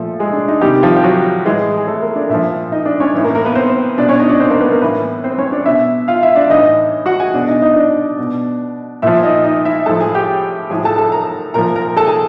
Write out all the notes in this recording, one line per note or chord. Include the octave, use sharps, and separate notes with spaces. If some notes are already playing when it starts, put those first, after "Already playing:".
Already playing: A#2 F3 A3 A4
G#3 G#4
D4
D#4
C3 D#3 G3 G4
F3 F4
G4
F#3 F#4
A2 E3 G#3 G#4
G#4
A3 A4
A#3 A#4
D4 D5
A#2 F3 E4 E5
D#4 D#5
D4 D5
C#4 C#5
A2 E3
A#3 A#4
A#3 A#4
B3 B4
C4 C5
B2 D4 D5
C#4 C#5
D#4 D#5
D4 D5
C4 C5
A#3 A#4
B3 B4
A#3 A#4
A2 E3 B3 B4
C4 C5
C#4 C#5
D4 D5
B2 E4 E5
F4 F5
E4 E5
D4 D5
A2 E3 D#4 D#5
F#4 F#5
G#4 G#5
B2 D4 D5
D#4 D#5
D#4 D#5
D4 D5
B2
A#2 F3 E4 E5
D#4 D#5
D#4 D#5
E4 E5
A2 F3 A4 A5
G#4 G#5
G4 G5
A2 F3 G#4 G#5
A4 A5
A4 A5
A#4 A#5
A#2 F3 A#4 A#5
A#4 A#5
A4 A5
G#4 G#5